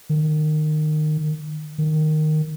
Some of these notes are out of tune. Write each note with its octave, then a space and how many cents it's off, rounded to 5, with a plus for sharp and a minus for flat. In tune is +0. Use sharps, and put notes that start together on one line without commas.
D#3 -25
D#3 -10